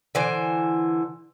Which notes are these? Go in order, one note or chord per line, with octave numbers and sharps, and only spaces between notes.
D3 E3 C5